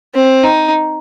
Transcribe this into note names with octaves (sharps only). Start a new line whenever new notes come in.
C4
D#4